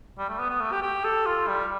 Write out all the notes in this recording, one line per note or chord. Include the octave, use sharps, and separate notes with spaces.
G3
A3
B3
B3
A3
G4
G4
A4
F4
G3